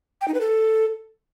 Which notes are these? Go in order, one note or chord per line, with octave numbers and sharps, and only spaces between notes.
G5
D#4
B4
A4